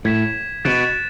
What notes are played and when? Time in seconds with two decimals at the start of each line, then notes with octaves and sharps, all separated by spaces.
0.05 A2 G#6 B6 E7
0.65 B2 F#6 A6 E7